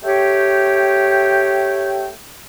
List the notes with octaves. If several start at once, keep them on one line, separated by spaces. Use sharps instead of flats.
A3 G4 C#5 G5